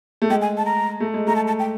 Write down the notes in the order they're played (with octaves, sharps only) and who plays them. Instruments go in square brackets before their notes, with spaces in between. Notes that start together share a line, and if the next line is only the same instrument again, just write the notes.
[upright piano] A3
[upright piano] G#3 [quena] G5
[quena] G#5
A5
A#5
[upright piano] A3
G#3
[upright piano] A3 [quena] A#5
[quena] A5
A5
G5